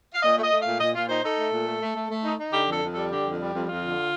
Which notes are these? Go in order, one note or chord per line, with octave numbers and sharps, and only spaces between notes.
F5
A#2 D#5
A3
D#5
A3
F5
A#2
A#2 D#5
A#2 F4
D#4 C5
D#4 A4
A3
A#2
A3
A3
A3
A3
D#4
D#4
D3 G4
F2 A4
F2
G3 A4
D3 G4
F2
G3
F2
F2 F4
D3